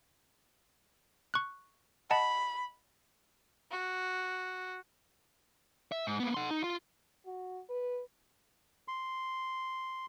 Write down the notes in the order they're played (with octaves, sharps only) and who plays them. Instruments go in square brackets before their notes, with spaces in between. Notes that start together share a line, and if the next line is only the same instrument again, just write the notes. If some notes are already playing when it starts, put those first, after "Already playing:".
[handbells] C#6 F#6
[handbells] D#5 F#5 A5 [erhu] B5
[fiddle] F#4
[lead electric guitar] E5
G#2
A#3 B3
F#5 C6
D#4
F4
[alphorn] F#4
B4
[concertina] C6